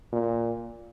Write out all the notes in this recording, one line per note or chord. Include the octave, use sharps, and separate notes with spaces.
A#2